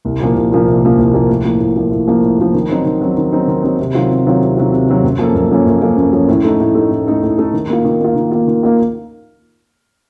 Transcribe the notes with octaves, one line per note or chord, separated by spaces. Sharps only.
C2
A#2 F3 A#3
C2
A#2 F3 A#3
C2
A#2 F3 A#3
C2
A#2 F3 A#3
A2
F3 A#3
A2
F3 A#3
A2
F3 A#3
A2
F3 A#3
D#3
F#3 C4 D#4
D#3
F#3 C4 D#4
D#3
F#3 C4 D#4
D#3
F#3 C4 D#4
C3
D#3 F#3 C4 F4
C3
D#3 F#3 C4 F4
C3
D#3 F#3 C4 F4
C3
D#3 F#3 C4 F4
F#2
F3 A#3 C#4 A4
F#2
F3 A#3 C#4 A4
F#2
F3 A#3 C#4 A4
F#2
F3 A#3 C#4 A4
A2
A3 D#4 A4
A2
A3 D#4 A4
A2
A3 D#4 A4
A2
A3 D#4 A4
D#3
A#3 F4
D#3
A#3 F4
D#3
A#3 F4
D#3
A#3 F4